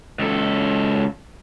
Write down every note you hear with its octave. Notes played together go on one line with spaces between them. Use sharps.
C#2 A4